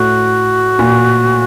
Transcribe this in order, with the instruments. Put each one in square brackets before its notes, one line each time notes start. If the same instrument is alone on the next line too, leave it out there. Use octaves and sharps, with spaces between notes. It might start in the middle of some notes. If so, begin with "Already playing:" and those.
Already playing: [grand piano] A2 [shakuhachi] F#4
[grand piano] A#2